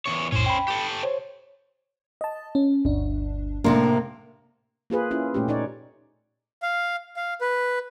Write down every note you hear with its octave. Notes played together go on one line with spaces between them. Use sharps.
E2 C3 C#5
B1 F2 A2 C#4 C5
G5 B5
G4 A4
C5 C#5
D#5 A5
C#4
G1 D2 D4
A2 C3 A#3 D4 C6
A#3 F4 G#4 B4
C#4 E4 F4
A#2 A3 C#4 G4
A#2 D#4 C#5 D5
F5
F5
B4